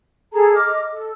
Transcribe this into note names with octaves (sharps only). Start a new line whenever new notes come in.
G#4 A4 A5 A#5
D#5 D6 F6
A4